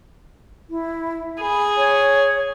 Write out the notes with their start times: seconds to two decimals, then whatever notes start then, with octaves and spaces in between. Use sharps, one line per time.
0.70 E4
1.40 G#4 B5
1.77 C#5